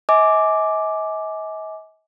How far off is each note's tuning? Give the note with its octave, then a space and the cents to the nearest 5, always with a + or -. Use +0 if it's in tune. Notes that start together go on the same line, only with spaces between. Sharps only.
D#5 +45 G#5 +20 D6 +0